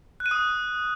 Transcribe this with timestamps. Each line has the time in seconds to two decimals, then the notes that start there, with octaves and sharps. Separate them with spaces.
0.20 F#6
0.26 D#7
0.31 D#6